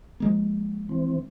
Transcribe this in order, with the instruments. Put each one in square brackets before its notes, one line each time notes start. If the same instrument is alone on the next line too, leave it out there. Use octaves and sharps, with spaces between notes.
[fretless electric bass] F3 G#3 A#3
[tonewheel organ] E3 C4